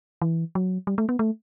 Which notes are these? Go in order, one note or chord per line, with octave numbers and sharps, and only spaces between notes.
E3
F#3
G3
A3
B3
A3